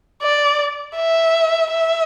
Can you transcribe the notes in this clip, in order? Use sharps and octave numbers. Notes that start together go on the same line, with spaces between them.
D5
E5
E5